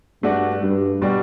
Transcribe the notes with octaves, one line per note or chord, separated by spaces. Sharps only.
G2 A3 D4 F#4
G2
B2 G3 D4